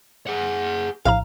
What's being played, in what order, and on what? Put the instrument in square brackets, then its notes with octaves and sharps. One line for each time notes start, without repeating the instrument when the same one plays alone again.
[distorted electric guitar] G#4 F#5
[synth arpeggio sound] A#1 A2 A#5 [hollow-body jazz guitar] F5